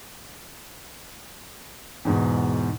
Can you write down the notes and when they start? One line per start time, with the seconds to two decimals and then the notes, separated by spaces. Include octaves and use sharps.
2.05 E2 G#2 B2